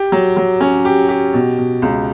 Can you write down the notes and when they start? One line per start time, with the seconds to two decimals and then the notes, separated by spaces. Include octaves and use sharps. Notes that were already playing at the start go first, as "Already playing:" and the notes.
Already playing: G4
0.12 F#3
0.37 F#3
0.60 C#4
0.85 G4
1.09 G4
1.34 B2
1.58 B2
1.82 C#2